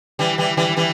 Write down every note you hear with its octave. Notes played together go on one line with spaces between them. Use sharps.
E3 G3
E3 G3
E3 G3
E3 G3